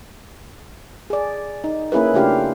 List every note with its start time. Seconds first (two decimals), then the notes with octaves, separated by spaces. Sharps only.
1.10 G#4 D5
1.64 D#4
1.92 A#3 C#4 E4 G#4 B4
2.14 C#3 A3 D4 F4 G4 F5